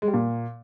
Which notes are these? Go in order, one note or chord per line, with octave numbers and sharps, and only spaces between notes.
G#3
G3
A#2